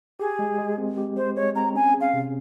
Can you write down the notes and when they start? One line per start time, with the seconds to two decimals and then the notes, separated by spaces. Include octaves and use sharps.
0.20 G4 G#4
0.39 G#3
0.58 G#3
0.78 C4
0.97 G4
1.17 G#3 C5
1.36 G#3 C#5
1.55 C4 A#5
1.75 C#4 G#5
1.94 G#4
2.01 F5
2.14 C3